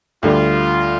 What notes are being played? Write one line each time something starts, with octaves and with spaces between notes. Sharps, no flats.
D2 D3 G3 F4